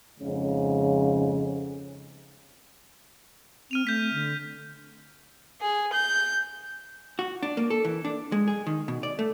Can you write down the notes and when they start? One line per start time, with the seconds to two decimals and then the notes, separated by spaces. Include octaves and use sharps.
0.20 F2 G#2 C#3
3.71 C4 F6 D#7 F7
3.87 A3 G6 B6
4.13 D3
5.62 G#4
5.93 G6
7.19 F#4
7.43 D4
7.57 A#3
7.70 A4
7.85 E3
8.05 D4
8.32 G#3
8.48 G#4
8.67 D#3
8.88 B2
9.03 D5
9.19 A3